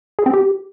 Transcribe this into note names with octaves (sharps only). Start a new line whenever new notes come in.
G#4
C4
G4